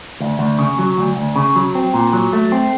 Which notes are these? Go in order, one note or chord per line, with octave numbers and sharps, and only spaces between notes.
D2
D2
C#3
F#3
D2
D2
C#3
F#3
C4
A#2
F#3
A3
C4